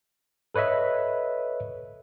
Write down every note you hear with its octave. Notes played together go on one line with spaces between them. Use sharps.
A4 B4 C#5 D#5 E5